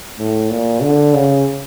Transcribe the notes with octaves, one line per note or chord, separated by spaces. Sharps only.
A2
A#2
D3
C#3